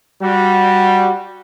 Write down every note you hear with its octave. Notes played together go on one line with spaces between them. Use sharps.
G3 F#4